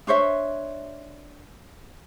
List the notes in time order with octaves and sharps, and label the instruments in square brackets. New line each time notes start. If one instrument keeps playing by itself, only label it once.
[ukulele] D4 C5 C#5 E5